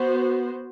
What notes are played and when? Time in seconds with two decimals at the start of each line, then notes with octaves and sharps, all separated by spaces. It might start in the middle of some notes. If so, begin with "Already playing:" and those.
Already playing: B3 F#4 C5